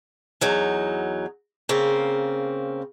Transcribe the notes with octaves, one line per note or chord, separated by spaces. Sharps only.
E2 F#3 D#4
C#3 A#3 C4